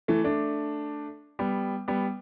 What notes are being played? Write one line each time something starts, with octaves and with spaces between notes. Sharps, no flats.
E3 A3
A3 D4
G3 B3
G3 B3